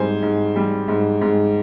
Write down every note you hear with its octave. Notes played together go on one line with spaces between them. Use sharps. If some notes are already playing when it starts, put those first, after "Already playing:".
Already playing: G#2 G3 C5 G#5
G#2
G3
G#2
G#2